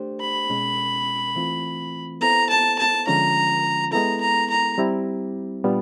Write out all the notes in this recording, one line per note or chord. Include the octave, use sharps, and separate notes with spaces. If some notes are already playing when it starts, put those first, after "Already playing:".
Already playing: A3 D4 G4 C5
B5
B2 G#3 C#4
E3 A3 C4 F4
B3 E4 A4 C5 A#5
A5
A5
D3 F3 G#3 C#4 F4 A#5
G#3 B3 E4 A4 A#5
A#5
A#5
G3 C4 E4 G4
A#2 G3 B3 D4 F4